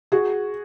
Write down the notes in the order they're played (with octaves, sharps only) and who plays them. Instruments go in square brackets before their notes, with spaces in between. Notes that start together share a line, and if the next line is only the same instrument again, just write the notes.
[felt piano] F#4 G#4